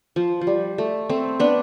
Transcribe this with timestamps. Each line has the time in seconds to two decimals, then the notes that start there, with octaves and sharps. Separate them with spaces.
0.16 F3
0.41 F3
0.47 G3
0.78 A3
1.09 A3 C4
1.39 B3 D4